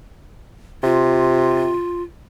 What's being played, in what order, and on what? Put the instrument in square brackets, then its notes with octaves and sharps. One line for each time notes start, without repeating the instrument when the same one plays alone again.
[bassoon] C3 [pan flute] F4